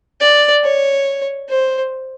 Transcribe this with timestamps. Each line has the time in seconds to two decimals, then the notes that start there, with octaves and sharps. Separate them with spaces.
0.21 D5
0.64 C#5
1.49 C5